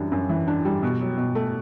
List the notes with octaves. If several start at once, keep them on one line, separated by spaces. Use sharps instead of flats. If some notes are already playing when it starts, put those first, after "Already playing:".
Already playing: F#2 E3 G3 D4
F#2
E3
D4
G3
B2
F#3
B2
A3